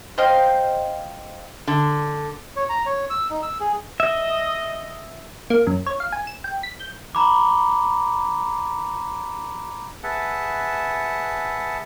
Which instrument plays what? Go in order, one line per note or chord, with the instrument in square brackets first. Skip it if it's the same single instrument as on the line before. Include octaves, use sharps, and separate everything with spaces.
[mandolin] C5 D#5 F5 G5
[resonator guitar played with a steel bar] D3
[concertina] C#5
A#5
C#5
E6
D#4
E6
G#4
[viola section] D#5 [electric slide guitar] E5
[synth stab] A#3
F#2
C#5
F5
G#5
E7
G5
B6
G6
[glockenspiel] A#5 B5 D6
[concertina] G#4 B4 E5 F#5 A5